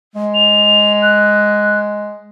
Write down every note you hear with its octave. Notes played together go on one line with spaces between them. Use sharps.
G#3
F7
F#6